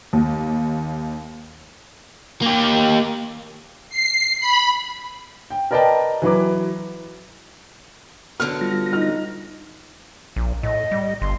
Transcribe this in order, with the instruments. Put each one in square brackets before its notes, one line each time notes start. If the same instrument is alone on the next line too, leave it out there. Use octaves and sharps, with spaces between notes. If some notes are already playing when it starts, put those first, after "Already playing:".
[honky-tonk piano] D#2
[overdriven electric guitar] A#3 G4
[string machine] C7
B5
[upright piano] G5
A#4 B4 D5 D#5 G5 A5
E3 F#3 B4 D6
[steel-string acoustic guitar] D3 F#3 B3 [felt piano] F6
[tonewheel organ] G3 F4 A#6
[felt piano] D#4 F6
[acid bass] A#1
[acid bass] A2 [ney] D#5
[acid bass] G3
[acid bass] G1 [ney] C6